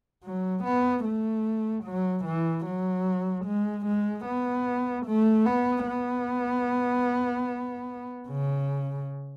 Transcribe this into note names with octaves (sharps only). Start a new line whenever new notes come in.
F#3
B3
A3
F#3
E3
F#3
G#3
G#3
B3
A3
B3
B3
C#3